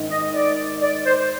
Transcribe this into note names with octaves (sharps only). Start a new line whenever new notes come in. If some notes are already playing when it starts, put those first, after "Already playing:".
Already playing: G#2 D#3
D#5
D5
D5
C5